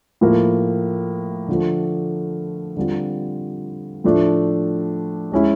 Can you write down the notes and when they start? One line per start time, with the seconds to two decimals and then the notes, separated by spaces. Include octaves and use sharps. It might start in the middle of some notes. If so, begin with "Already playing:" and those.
0.21 A2 F3 A#3
1.48 D3 F3 A3
2.77 D3 G3 C4 F4
4.04 A2 F3 A3 D4
5.32 G#3 C#4 E4